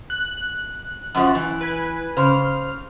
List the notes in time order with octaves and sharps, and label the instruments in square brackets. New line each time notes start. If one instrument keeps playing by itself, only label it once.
[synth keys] F#6
[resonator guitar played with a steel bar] F#2 F3
E3
[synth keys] B4 G#5
[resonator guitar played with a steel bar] C#3 C5 [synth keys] F6